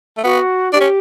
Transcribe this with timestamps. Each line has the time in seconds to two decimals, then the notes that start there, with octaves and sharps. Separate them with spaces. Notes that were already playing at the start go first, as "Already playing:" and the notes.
0.17 A3
0.24 B3 F#4
0.73 D4 G4
0.81 C#4